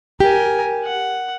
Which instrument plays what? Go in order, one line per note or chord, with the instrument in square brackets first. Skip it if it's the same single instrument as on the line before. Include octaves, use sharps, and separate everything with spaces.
[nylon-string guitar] G4 [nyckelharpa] A#4 G#5
[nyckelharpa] F#5